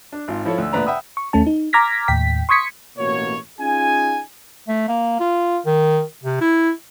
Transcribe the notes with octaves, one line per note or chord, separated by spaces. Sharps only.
D4
G#1 F4
F3 E4 A4 C#5
D2 E6
D2 A#2 D3 B4 D5 A#5
E5 F#5 G5 B5 D#6 E6
C#6
D#2 A3 C#4 A5
D#4
A#5 D6 F6 G#6 A#6 B6
D#2 A2 G5 B6
C6 C#6 D#6 G#6 B6 C#7
A1 B2 A#3 F#4 C#5
C#4 D#4 F4 G#4 G#5
A3
A#3
F4
D#3
C3
E4